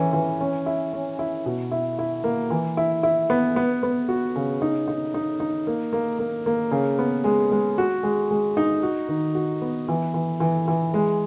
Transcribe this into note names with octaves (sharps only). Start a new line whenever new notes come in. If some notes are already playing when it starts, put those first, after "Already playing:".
Already playing: E3 C#4
E3
C#4
E4
C#4
E4
B2
E4
E4
A#3
E3
E4
E4
B3
B3
B3
F#4
C#3
D#4
D#4
D#4
D#4
A#3
A#3
A#3
A#3
C#3
B3
G#3
G#3
F#4
G#3
G#3
D#4
F#4
D#3
F#4
B3
E3
E3
E3
E3
G#3